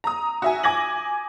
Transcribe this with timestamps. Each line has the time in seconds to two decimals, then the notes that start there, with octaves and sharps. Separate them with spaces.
0.04 A#5 D#6
0.42 F#4 E5 G#5
0.63 G#5 D6 G#6 A#6 F#7